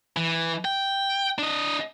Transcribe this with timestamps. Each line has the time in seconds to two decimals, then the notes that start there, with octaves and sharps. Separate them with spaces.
0.17 E3
0.65 G5
1.39 D4 D#5